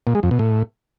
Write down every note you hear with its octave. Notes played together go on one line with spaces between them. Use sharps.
A#2
G#3
F2
B2
A2